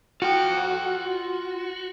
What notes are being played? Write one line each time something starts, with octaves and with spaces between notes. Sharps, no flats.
F4 F#4 G5